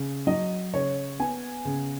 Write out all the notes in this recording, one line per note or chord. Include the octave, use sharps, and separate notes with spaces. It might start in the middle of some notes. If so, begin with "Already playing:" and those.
Already playing: C#3
F#3 D#5
C#3 C#5
B3 G#5
C#3